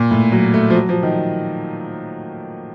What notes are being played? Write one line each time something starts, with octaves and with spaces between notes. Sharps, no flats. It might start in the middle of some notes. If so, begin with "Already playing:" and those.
Already playing: A#2
A2
F#3
A3
F3
F#3
F3
D#3